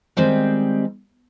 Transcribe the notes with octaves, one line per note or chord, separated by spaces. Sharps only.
D#3 G3 G#3 C4